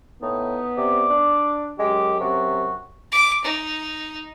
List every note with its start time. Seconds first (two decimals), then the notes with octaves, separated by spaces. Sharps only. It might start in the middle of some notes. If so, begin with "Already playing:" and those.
0.22 A2 B3 D#4
0.78 C3 D5
1.10 D4
1.79 F#2 G#3 G4
2.20 C3 F#4
3.12 D6
3.44 D#4